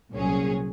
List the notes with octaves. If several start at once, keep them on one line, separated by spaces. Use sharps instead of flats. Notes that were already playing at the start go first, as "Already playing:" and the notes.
C2 A#2 F#3 C#4 G#4